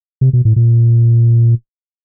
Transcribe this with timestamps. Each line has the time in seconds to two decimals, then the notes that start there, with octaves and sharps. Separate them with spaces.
0.21 C3
0.33 B2
0.45 A2
0.56 A#2